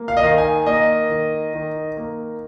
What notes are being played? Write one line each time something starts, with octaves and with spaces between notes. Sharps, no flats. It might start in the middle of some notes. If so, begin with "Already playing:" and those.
Already playing: A#3
F5
D#5
D#3 F5
G#5
A#3 D#5
D#3
D#3
A#3